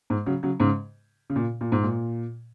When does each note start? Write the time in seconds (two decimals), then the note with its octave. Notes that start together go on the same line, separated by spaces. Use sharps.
0.10 G#2
0.26 C#3 F#3
0.43 C#3 F#3
0.60 G#2 C#3
1.30 C#3
1.36 A#2
1.61 A#2
1.72 G#2
1.83 A#2